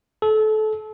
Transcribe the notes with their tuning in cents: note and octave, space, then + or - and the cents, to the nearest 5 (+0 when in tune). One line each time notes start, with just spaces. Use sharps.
A4 -25